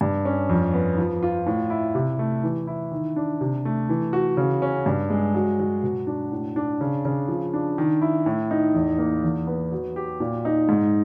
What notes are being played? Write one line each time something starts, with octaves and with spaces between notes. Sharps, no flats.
G2
C#4
F2
B3
F3
F4
A2
E4
C3
A3
E3
E4
D#3
D4
C3
A3
E3
F#4
C#3
C#4
G2
G#3
F#3
F#3
B2
D4
A2
D4
C#3
C#3
F3
D4
D#3
E4
A2
D#4
E2
A#3
E2
B3
F#3
G4
A#2
D#4
G#2